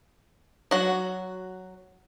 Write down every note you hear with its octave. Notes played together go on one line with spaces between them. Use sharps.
F#3 F#4